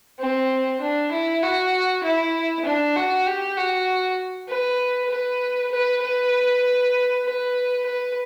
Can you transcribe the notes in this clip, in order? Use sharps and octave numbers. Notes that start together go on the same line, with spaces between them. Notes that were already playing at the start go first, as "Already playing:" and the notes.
C4
D4
E4
F#4
E4
D4
F#4
G4
F#4
B4
B4
B4
B4
B4
B4